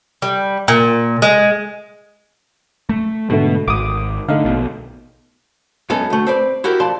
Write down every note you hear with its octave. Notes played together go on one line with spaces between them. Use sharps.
G3
A#2
G#3
A3
G#2 B2 D3 A3
G#1 D6 D#6
D3 A3 D#4 F5
A#1 B2
F#2 G#3 B3 A4
D2 A3
C4 B4 D5
E4 F#4 G4 A#4
F2 D5 A5 C6